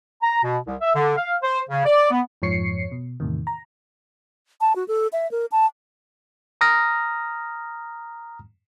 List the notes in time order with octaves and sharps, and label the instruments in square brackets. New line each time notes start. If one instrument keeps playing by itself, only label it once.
[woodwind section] A#5
B2
C2
E5
D3
F5
C5
C#3
D5
B3
[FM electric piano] F2 G#2 F3 C#5 C7 C#7
B2
E2 A2 C3 D#3
A#5
[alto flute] A5
F#4
A4
E5
A#4
A5
[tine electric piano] A#5 D#6 F6 A#6